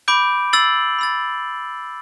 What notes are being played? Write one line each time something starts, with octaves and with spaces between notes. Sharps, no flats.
B5 D6 G6 D7
E6 A6 C7 F#7
B5 E6 A6